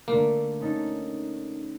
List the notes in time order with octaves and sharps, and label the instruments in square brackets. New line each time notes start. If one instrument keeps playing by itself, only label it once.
[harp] D3 A3 [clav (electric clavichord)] A#3
[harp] C#4 D#4 A4